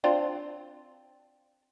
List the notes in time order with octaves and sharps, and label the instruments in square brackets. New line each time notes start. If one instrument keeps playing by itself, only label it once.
[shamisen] C4 D4 F4